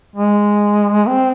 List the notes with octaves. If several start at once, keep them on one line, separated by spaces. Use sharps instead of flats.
G#3
C4